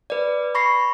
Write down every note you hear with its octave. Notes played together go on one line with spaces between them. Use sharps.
B4 D5
B5 C#6 A#6 C7